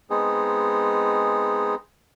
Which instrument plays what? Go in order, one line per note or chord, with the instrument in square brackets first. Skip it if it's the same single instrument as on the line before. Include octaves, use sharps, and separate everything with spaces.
[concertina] G#3 B3 C4 D#4 G#4